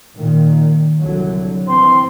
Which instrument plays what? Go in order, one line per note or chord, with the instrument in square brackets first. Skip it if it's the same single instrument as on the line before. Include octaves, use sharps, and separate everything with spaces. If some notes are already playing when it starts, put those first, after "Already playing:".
[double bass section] A#2 D#3
C2 D3 F#3
[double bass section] E3 C4 [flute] C6